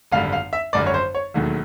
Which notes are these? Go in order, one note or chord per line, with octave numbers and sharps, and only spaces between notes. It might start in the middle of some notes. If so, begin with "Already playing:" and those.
G#1 F#2 D3 G3 F5
F5
E5
G#1 F#2 D3 G3 D5
C#5
C5
C#5
E1 D#2 D#3 F#3 A3